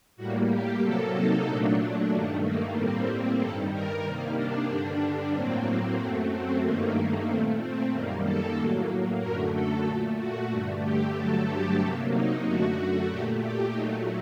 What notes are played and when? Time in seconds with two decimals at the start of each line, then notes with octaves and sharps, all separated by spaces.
0.16 A2 G3 A#3 F#4
0.49 G4
0.81 C3 F#3 A#3 A4
1.14 D#4
1.45 A#2 F#3 A3 D4
2.10 G2 D#3 A3 A#3
2.43 A#3
2.75 A2 G3 A#3 C4
3.39 G2 D#3 G3 A4
3.72 A#4
4.04 C3 D#3 G3 A#3
4.36 D4
4.68 G2 D3 G3 D4
5.33 A2 F#3 A#3 C4
5.98 F#2 F#3 A3 C4
6.30 C4
6.62 G2 D#3 A3 A#3
7.26 A#2 A3 C4
7.59 C4
7.91 F#2 D#3 G3 A#3
8.24 A4
8.57 A2 F#3 A#3
9.21 F#2 D3 F#3 A3 A#4
9.53 A4
9.86 A#2 A3
10.17 F#4
10.50 G2 D3 A3
10.82 G4
11.14 G2 D3 F#3 A3 A4
11.47 G4
11.79 C3 F#3 A#3
12.12 D#4
12.43 F#2 D3 A3 F#4
13.08 A#2 A3 G4
13.41 G4
13.73 A#2 F#3 A3 D#4